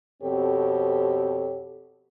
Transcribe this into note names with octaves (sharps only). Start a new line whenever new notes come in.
F2 B2 C4 G4 A4 C#5